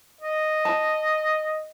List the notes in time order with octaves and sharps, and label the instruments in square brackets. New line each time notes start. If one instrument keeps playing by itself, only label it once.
[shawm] D#5
[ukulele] A5